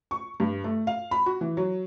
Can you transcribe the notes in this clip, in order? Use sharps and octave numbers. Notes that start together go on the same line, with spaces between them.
C#6
G2
A3
F5
B5
F#4
E3
F#3